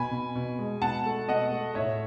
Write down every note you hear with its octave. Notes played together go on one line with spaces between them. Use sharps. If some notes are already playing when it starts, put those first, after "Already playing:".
Already playing: B2 G#5 B5
B2
B2
G#3
B2 F#5 A5
A3
B2 D#5 F#5
A3
A2 C#5 E5